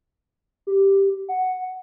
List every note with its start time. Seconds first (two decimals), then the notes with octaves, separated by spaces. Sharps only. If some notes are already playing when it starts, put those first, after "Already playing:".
0.67 G4
1.29 F#5